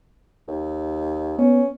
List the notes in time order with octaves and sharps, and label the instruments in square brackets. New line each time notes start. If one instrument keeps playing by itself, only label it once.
[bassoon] D#2
[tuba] B3 [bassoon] C#4